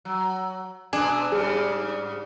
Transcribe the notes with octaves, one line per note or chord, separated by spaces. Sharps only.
F#3
B2 G#3 D4 G#4 G#5
E6
G#2 C#3 G3 G#4